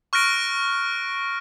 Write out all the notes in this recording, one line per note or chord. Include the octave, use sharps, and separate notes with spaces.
C#6 F6 F#6 A#6 D7